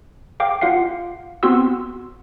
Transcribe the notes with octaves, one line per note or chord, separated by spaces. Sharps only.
F5 G5 D6
F4 F5 F#5 C7
B3 C4 F#4 C6 C#6 E6